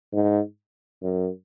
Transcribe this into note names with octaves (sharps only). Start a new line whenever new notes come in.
G#2
F#2